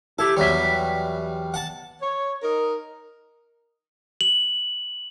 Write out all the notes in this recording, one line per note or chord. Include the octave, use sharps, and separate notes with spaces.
E4 G4 A4
E2 F#3 G3 C#5 E5
F#5 A5
C#5
D#4 A#4
F#7